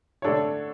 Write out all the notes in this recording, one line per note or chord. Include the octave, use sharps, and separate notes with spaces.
D3 A3 D4 A4 C#5